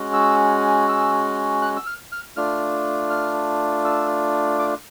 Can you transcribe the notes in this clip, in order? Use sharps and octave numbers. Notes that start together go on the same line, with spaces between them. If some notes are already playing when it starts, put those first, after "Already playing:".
Already playing: G#3 C#4 F#4
E6
E6
F#6
E6
F6
F6
A3 D4 F4 F6
F6
E6
D6